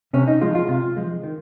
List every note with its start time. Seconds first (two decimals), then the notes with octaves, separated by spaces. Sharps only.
0.13 C3 C#4
0.28 D#4
0.41 F3 G#3 F4
0.55 F4
0.68 C3 F4
0.97 F3 G#3
1.23 D#3